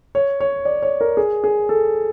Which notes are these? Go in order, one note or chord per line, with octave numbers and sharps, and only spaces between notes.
C#5
C#5
D5
C#5
A#4
G#4
G#4
A4